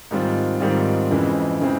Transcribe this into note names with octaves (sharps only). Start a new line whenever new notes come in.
G#2 D#3 G3 C4 F4
G#2 D#3 G3 C4 F4
F2 C#3 E3 G#3 C4
C#3 E3 G#3 C4